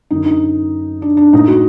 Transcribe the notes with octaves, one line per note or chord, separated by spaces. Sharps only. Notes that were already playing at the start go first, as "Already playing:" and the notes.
F#2 D3 D#4
D#4
D4
D4
A2 D#4
F#4